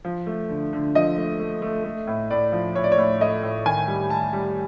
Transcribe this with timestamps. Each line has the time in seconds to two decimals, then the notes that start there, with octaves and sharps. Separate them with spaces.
0.05 F3
0.26 A3
0.49 D3
0.73 D3
0.95 F3 D#5
1.17 A3
1.39 A3
1.62 A3
1.84 A3
2.07 A2
2.30 A2 D5
2.52 F3
2.75 A2 C#5
2.84 D5
2.92 C#5
2.98 A2
3.20 A3 D#5
3.43 A2
3.66 D#3 G#5
3.88 G3
4.10 G3 A5
4.33 G3